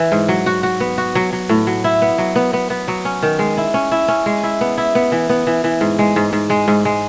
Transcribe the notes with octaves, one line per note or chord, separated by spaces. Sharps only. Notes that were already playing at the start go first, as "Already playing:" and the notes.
Already playing: E3
G#2
F#3
F#4
F#4
B3
F#4
F#3
F#3
A2
F#3
E4
B3
F#3
B3
B3
B3
F#3
C#4
D#3
G#3
E4
C#4
E4
C#4
G#3
E4
B3
E4
B3
E3
B3
E3
E3
G#2
G#3
G#2
G#2
G#3
G#2
G#3